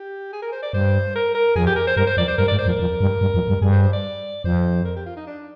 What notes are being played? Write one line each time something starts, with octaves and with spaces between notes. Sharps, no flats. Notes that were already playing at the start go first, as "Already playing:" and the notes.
Already playing: G4
G#4
A#4
C5
D5
G2 C5
A#4
A#4
F2 G#4
G4
A#4
C5
G2 A#4
C5
F2 D5
C5
G2 A#4
G#2 D5
C5
F2
A#4
F2
G2
G2
F2
G2
G2 G#4
C5
C5
D5
F2 C5
A#4
G4
F4
D#4
D4